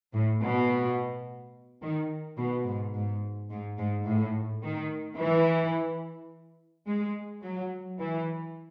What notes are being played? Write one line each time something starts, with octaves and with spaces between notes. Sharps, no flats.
A2
B2
D#3
B2
G#2
G#2
G#2
G#2
A2
D#3
E3
G#3
F#3
E3